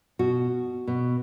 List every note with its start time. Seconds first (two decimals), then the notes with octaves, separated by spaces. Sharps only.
0.19 B2 F#4
0.87 B2